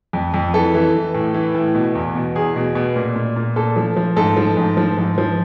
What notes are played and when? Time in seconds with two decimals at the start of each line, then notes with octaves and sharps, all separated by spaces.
0.13 F2
0.34 F2
0.54 E3 A4
0.74 E3
0.95 E3
1.14 A2
1.34 E3
1.55 A2
1.75 B2
1.95 E2
2.15 B2
2.35 E2 G#4
2.56 B2
2.75 B2
2.96 A#2
3.16 A#2
3.36 A#2
3.56 A#2 A4
3.76 F3
3.96 F3
4.16 G#2 A4
4.37 F3
4.57 G#2
4.77 F3
4.97 G#2
5.18 F3